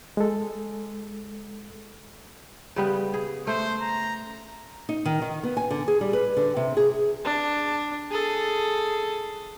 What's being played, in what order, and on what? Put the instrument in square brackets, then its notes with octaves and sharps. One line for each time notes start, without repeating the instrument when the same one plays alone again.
[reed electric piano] G#3 A4
[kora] C#3 G3 B3
G#4
[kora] A3 [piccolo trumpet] C5
[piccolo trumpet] A#5
[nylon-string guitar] D#4
D#3
D#3
B3
G#5
D3
G#4
G3
B4
D3
C3
G#4
[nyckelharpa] D4
G#4 A4